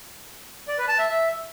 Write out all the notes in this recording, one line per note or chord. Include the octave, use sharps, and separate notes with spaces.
D5
B4
A5
E5
E5